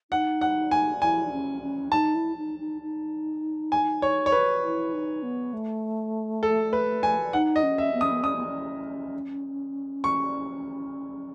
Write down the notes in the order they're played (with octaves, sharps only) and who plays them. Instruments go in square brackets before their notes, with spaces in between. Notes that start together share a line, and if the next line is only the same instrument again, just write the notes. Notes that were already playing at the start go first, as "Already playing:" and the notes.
[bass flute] D#4 [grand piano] F#5
[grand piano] F#5
G#5
[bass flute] E4 [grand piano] G#5
[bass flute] D#4
C#4
C#4
[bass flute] D#4 [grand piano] A5
[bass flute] E4
D#4
D#4
D#4
[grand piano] G#5
C#5
C#5
B4
[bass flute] E4
D#4
B3
A3
[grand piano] A4
B4
G#5
[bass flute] D#4 [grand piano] F#5
[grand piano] D#5
[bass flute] C#4
[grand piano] E5
[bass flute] B3
[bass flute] C#4 [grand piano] D#6
[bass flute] B3
[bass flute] C#4 [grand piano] D#6
[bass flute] B3
C#4
[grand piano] C#6